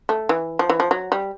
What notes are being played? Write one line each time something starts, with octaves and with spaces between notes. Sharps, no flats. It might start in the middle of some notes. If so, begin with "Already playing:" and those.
A3
E3
F3
E3
F3
F#3
G3